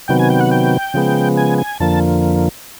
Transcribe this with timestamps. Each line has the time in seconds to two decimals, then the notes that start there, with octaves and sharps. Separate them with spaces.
0.08 C3 D#3 F#3 B3 G5
0.19 G#5
0.30 G5
0.41 F#5
0.51 G5
0.94 C#3 F3 G#3 B3
1.37 G#5
1.58 G#5
1.80 F2 D3 F3 A#3 A5